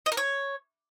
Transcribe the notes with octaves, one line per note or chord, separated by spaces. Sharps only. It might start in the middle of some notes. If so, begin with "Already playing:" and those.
D#5
A#4
C#5